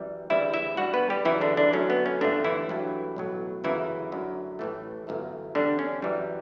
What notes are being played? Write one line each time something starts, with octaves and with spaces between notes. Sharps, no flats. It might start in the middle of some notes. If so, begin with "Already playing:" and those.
Already playing: F#2 E3 G3
D2 C#3 E3 G3 E4 E5
E4 E5
G2 E3 G3 F#4 F#5
B3 B4
G3 G4
F#2 C#3 E3 G3 E4
D3 D4
D3 D4
F#2 D3 F#3 A3 C#4
B3
C#4
G1 G2 D3 E3 A3 D4
E3 E4
G2 F#3 A3
B1 A2 F#3
G1 F#2 C#3 E3 E4
F#2 D3 F#3 A3
A1 A2 E3 A3
G1 F#2 E3 A3
E2 D3 G3 D4
C#4
F#2 E3 G3